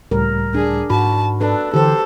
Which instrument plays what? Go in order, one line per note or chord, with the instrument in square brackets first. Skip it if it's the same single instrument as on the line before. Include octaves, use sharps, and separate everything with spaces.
[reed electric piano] C#2 A2 G3 [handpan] A#4
[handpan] D4 [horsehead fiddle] G#4
[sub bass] G#2 [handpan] F#4 [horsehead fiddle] A5 [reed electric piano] B5
[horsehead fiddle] D4 [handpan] A4 B4
[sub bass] D3 [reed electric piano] E3 [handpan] G4 C5 [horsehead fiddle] A4